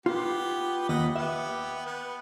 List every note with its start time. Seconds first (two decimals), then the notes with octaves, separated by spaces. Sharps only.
0.06 B3 F4 G4
0.89 D#2 D#5 F#5 B5
1.16 B3 G4 E5
1.86 B3